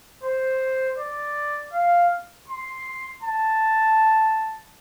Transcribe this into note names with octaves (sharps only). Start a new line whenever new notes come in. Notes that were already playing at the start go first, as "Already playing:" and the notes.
C5
D5
F5
C6
A5